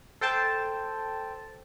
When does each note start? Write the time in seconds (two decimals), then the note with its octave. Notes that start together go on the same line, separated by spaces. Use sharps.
0.21 A4 C5 G5 A5